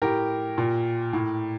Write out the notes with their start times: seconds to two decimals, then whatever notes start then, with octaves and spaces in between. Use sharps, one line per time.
0.02 A2 G4 A#4
0.58 A#2
1.13 A2